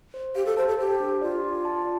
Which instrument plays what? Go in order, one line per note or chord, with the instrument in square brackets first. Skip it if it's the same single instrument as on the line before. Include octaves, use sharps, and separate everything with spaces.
[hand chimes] C5
[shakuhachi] G4 [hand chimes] F5
[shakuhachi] A4
[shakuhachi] C5 [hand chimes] A5
[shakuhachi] A4
[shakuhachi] G4 [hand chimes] C5
[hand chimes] D4
[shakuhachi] F4 [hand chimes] D5
[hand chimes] D5
A5